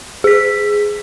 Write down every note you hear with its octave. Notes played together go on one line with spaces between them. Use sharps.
G#4 B6